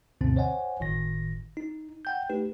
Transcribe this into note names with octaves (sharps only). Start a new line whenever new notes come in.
D2 G2 B2 D3 C4
C5 C#5 D#5 F#5 G#5
G1 A2 D#3 A#6
D#4
F#5 G5 G6
A3 D#4 G4 B4